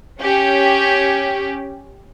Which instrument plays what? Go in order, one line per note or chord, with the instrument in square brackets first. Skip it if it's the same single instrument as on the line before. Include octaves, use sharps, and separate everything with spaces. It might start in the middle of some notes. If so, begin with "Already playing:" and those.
[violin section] C#4 G4